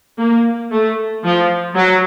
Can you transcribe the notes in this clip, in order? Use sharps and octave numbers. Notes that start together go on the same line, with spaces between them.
A#3
A3
F3
F#3